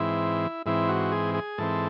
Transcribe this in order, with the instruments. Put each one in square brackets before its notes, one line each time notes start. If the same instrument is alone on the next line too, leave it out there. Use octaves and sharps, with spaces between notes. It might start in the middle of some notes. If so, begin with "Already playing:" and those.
Already playing: [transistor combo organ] G#2 E3 C4 E4
G#2 E3 C4 E4
F#4
G#4
G#4
G#2 E3 C4 A4